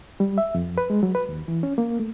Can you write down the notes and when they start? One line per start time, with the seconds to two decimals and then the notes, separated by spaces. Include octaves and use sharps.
0.20 G3
0.38 E5
0.55 F2
0.78 B4
0.90 G#3
1.03 F#3
1.15 B4
1.29 D#2
1.48 E3
1.63 C#4
1.78 A#3
1.99 A3